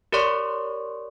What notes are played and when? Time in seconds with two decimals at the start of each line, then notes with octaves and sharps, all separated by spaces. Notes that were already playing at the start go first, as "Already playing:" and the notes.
0.12 G4 A#4 C#5 D5 C6 C#6